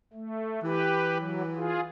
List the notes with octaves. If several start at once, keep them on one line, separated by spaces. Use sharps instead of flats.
A3
E3 G4 B4
F#3
F4 G#4